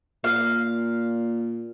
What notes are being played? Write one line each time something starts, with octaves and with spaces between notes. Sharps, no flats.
A#2 F5